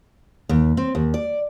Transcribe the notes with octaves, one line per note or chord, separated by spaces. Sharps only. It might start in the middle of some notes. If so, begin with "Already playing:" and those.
D#2
C4
D#2
D5